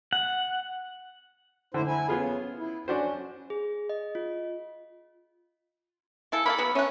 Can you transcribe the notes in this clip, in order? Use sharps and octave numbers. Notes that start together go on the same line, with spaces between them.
F#5
A2 D3 E4 C5
E4 G#5
C#3 B3 F4 G#4
E4
C#4 D4 F#4 C5
G#4
D#5
F4
C#3 E4 A4
A#3 E4 A4 B5
F#3 B3
A3 C#4 F#5